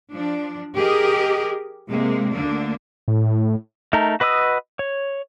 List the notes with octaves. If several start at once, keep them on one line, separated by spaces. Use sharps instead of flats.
F3 D4
G4 G#4 A#4 D#5
C3 G#3 A#3
D2 D3 A#3 D4
A2
A3 D#4 A#4
F#4 B4 D#5 D#6 E6
C#5